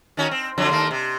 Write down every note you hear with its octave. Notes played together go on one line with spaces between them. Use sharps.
D#3 C#4 F#4
C4
F2 D3 F#3
D#2 A3 A#3
C3